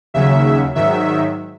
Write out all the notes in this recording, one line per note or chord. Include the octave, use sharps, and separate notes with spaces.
D#2 C#3 F#3 E5
G#2 D#3 F#3 E5